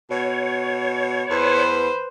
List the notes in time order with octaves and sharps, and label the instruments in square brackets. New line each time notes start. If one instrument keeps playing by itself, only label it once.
[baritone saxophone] B2 [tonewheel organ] C#5
[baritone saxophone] E2 [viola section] B4 [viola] C5